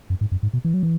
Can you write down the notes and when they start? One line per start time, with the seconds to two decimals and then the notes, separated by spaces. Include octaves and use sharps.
0.10 F#2
0.21 G#2
0.32 F#2
0.43 G#2
0.53 B2
0.65 E3
0.74 F#3
0.83 E3